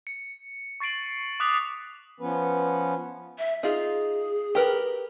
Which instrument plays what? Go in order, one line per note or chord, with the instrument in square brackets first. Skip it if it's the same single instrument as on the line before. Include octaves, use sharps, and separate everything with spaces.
[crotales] C#7
C#6 A6 C7 D7 F#7
D6 D#6 F#6 B6 F7
[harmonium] F3 B3 C#4 B4
[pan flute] E5
[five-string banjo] D#4 F4 [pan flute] G#4
[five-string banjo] G4 A#4 B4